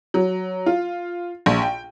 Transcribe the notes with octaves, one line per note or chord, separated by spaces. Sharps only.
F#3
F4
A#1
G5